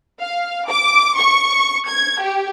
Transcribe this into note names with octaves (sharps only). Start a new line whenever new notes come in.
F5
D6
C#6
G#6
G4